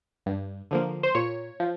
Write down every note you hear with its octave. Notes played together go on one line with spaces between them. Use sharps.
G2
D3 F3 A#3
C5
A#2 C#5
F3